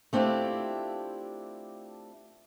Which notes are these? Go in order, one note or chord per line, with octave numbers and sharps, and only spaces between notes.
A3 C4 D4 E4 F4 G4